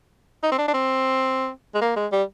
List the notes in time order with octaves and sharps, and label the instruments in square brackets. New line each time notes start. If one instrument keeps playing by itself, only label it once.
[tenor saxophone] D#4
C4
D4
D4
C4
G#3
A#3
G#3
G3